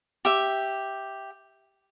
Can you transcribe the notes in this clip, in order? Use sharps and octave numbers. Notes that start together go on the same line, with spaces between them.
G4 E5